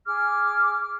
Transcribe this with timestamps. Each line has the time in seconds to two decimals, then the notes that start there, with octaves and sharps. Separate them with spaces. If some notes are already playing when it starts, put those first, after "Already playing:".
0.05 G#4 D6 F6